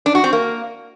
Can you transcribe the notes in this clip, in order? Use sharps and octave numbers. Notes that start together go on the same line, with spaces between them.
D4
F#4
C4
A#3